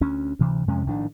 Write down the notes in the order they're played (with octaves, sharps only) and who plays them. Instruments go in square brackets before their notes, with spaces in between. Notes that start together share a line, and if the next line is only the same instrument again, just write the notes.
[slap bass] D2 C#4
D2 C3 E3
F2 C3 G#3 C#4
A#1 A2 D#3 D4